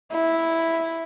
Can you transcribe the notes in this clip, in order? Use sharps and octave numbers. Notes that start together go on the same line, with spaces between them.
E4